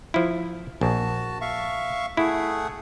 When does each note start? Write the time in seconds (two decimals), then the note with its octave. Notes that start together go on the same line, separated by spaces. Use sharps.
0.14 F3 E4
0.81 A#1 F#4 A5
1.41 E5 F5 C#6
2.17 A3 E4 G#4 F#5